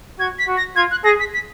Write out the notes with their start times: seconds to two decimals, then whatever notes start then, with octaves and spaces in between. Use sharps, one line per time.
0.19 F#4 G#6
0.39 B6
0.48 F#4
0.57 A#6
0.76 F4 G#6
0.91 F#6
1.04 G#4 A#6
1.20 B6
1.34 B6